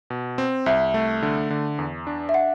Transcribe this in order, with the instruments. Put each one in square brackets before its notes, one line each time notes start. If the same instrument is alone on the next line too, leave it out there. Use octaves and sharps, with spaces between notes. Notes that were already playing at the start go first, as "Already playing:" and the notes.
[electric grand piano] B2
C4
[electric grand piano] C2 [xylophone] E5
[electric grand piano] A3
D3
D3
E2
D4
[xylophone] E5
F#5